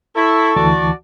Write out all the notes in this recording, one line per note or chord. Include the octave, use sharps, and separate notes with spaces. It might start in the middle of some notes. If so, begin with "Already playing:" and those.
E4 A4 C#6
D2 E3 F#4 D5 A5